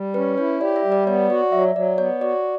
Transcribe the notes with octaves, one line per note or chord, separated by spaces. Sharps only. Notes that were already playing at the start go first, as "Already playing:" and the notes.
Already playing: G3
C#4 B4
E4 C#5
G4 D5
E5
G3
D5
B3 C#5
F#4 D5
F#3 E5
F#3 D5
B3 C#5
F#4 D5